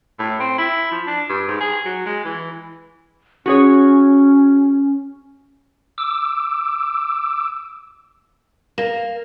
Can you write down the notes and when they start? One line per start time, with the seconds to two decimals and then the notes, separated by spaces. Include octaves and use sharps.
0.19 A2
0.40 C4
0.58 E4
0.92 F3
1.07 D4
1.30 G2
1.48 G#2
1.61 G#4
1.85 F#3
2.06 G#3
2.25 E3
3.46 C#4 F#4 G#4 C#5
5.98 D6 E6
8.78 A#3